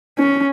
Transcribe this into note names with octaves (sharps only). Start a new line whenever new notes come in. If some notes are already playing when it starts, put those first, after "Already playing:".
C#4